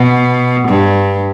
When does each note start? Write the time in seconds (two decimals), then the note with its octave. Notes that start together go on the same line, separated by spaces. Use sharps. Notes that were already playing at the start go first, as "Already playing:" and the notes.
Already playing: B2
0.68 G2